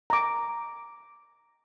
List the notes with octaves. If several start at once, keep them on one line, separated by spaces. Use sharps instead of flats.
A#5 D6